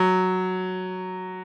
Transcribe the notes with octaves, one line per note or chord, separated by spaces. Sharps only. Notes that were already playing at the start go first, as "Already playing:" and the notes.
Already playing: F#3